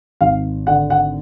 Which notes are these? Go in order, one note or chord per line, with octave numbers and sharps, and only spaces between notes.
G#1 F5
D3 F#5
F#5